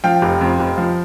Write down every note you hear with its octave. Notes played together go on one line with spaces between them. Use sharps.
F3 F5 G5
F1
F2
F1
F3